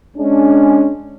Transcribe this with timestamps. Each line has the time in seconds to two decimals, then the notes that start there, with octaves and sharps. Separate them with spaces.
0.16 G#3 C#4 D4